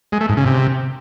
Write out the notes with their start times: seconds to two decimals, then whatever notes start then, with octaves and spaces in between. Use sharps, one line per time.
0.12 G#3
0.21 A3
0.29 G#2
0.37 C#3
0.46 C3